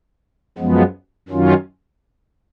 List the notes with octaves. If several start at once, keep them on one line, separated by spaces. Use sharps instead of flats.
F#2 F3 G#3 B3
F#2 D#3 F#3 C#4 F4